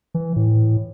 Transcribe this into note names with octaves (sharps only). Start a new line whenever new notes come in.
E3
A2